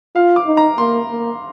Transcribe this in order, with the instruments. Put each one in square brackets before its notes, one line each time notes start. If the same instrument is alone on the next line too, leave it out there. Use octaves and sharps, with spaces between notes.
[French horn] F4 [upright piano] F5
[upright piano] D6
[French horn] D#4
[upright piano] A#5
[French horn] A#3 [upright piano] C6
[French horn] A#3